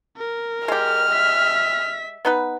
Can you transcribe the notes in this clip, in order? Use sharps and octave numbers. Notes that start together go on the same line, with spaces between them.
A#4
G#3 G4 F6
E5 B6
B3 D#4 B4